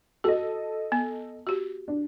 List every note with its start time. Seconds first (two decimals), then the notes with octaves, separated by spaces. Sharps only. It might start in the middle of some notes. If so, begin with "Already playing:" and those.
0.24 F#4 A4 D#5
0.92 B3
1.47 F#4 G4
1.88 D4